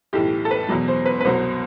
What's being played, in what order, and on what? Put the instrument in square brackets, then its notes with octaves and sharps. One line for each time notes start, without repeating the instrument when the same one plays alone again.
[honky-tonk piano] B1 A2 E3 G4
A4
B4
E2 B2 F#3
C5
B4
B4
C2 B2 F#3 C5